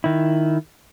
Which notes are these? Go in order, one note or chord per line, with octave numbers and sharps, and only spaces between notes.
D#3 E4